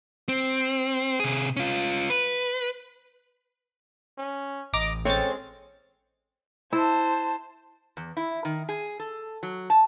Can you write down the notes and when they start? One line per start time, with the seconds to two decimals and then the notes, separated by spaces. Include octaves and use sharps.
0.29 C4
1.20 C3 G#4
1.57 C#4 F4
2.10 B4
4.18 C#4
4.74 A1 D#5 A#5 D6 A#6
5.05 G#3 C4 C#4 A4 C#5 A6
6.73 E4 C5 A5
7.97 E2
8.17 E4
8.45 D#3
8.69 G#4
8.99 A4
9.43 F#3
9.70 A5